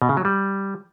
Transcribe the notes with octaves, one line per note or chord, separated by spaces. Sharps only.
B2
C#3
F#3
G3